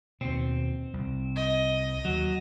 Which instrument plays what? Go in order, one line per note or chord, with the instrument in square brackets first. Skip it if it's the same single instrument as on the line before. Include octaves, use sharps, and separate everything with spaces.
[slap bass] D#2 B2 [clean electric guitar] C4
[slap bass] C2
[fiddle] D#5
[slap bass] D#2 [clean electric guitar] F#3